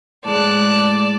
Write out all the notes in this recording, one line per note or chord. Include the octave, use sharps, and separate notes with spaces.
A2 G#3 D5 A5 F#6